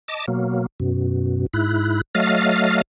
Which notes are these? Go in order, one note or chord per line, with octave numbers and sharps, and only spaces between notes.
D#5 A5 D6
B2 F#3 A#3
F#2 B2
G#2 E4 F#6
F#3 A3 D#5 F5 F6 A6